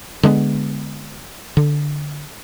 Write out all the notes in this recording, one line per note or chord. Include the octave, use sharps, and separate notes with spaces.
D3 G#3 A3 B3
D3